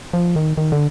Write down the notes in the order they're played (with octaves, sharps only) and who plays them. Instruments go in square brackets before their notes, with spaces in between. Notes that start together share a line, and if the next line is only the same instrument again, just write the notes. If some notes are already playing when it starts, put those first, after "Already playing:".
[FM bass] F3
D#3
D#3
D3